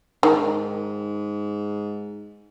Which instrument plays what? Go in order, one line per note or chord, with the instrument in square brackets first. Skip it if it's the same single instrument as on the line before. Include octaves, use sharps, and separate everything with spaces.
[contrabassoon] G#2 [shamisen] D#3